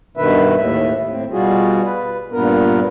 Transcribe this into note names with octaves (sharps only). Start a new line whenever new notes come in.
G2 B2 D#3 B4 E5
D#2 A2 E5
A2 C4
B2 G3 F4 F#4 G#4
B4
G2 A#2 B3 A#4